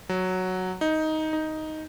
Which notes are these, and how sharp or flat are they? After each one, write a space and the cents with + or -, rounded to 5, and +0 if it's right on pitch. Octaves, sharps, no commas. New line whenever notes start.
F#3 +0
D#4 +10
D#4 +5